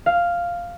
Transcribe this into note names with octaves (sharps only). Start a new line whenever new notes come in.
F5